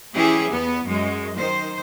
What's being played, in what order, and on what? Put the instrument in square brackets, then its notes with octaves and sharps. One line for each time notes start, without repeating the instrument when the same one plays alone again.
[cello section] E3 C#4 E4 G4 G#4
E2 B3
F#2 G#3
D#3 C5